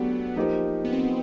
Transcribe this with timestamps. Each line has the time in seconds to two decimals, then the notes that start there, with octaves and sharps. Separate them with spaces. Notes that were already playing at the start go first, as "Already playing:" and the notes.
Already playing: F#3 A3 B3 D4 G4
0.36 F3 A#3 D#4 G4 C5
0.85 B3
0.92 C4